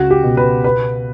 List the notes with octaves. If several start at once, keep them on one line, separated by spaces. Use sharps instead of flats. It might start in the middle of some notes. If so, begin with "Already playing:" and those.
Already playing: C#2 F#4
G4
B2
B4
B3 B4